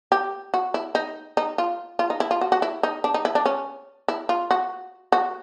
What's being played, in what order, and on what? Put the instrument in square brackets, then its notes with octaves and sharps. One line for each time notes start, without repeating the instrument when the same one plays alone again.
[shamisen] G4
F#4
E4
D#4
D#4
F4
F4
D#4
E4
F4
F#4
F#4
E4
D#4
D4
D#4
E4
D4
C#4
E4
F4
F#4
F#4